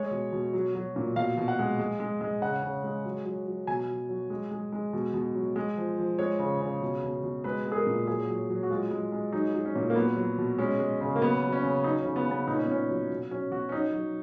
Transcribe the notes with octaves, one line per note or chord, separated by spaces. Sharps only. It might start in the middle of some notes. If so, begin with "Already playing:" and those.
Already playing: G#3 C#5
B2
B2
F#3
F#3
A#2
B2 F5
B2
F#5
G#3
G#3
G#3
G#3
C#3 F#5
C#3
G#3
F#3
F#3
F#3
B2 G#5
F#3
F#3
G#3
G#3
G#3
B2
B2
F#3
G#3
F3
F3
G#3 C#5
C#3
C#3
B2
B2
B2
G#3 B4
G#3
G#4
A#4
A#2
F#3 G#4
F#3
F#3
F#4
G#3 F4
G#3
G#3
F#3 D#4
F#3
C#4
A#2
A#3
F#3 B3
F#3
B2
G#3 C#4
G#3
C#3
A#3
F#3 B3
F#3
C#4
C#3
F#3 D#4
C#4
C#3
B3
C#3 B3
A#2 D#4
C#4
B3
A#2 C#4
F#3
B2
F#3 C#4
B2 F#4
C#4
F#3 D#4
F#3